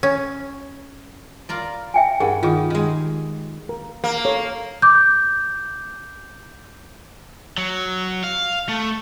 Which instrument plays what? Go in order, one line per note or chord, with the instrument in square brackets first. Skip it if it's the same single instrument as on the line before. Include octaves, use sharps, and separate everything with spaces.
[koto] C#4
[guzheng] F4 A#4 D5
[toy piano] E5 G5 G#5
[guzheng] G2 [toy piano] G#4 A#4 F#5
[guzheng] D#3 [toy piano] F4 G#4
[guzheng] D#3 G#3
[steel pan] A#4
[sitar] A#3
[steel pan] A4 C#5
[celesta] D6 G6
[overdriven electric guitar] F#3
F5
A3